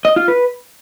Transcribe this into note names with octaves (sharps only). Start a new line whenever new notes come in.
D#5
F4
B4